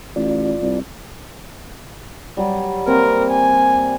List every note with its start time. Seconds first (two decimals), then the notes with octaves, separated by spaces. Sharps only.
0.16 A1 F4 D5
0.62 C2
2.37 F#3 G3
2.87 A#3 C4 A#4
3.31 G#5